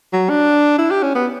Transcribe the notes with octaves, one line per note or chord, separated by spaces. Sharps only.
F#3
D4
E4
G4
C#4
B3